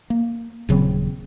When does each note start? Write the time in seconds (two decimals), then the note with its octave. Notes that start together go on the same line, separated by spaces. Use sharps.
0.10 A#3
0.69 D#1 C#3 F#3 C4